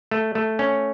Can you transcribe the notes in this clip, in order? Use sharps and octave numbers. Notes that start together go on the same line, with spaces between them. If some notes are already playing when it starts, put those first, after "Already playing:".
A3
A3
C#4